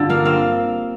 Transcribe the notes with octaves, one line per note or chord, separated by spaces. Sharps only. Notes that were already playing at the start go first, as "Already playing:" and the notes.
Already playing: G2 D3 G3 F4
A#3 F5
C4 F5